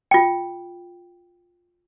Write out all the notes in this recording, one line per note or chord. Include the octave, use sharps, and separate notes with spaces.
F4 G5